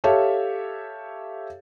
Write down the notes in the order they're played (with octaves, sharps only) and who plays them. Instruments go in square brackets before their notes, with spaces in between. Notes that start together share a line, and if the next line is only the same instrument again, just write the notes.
[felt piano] G4 A4 C#5 E5 F5 A5